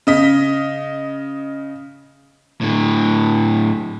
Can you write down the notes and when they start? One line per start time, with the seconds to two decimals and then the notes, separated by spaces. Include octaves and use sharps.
0.07 C#3 D#5 B6
2.61 A2 D3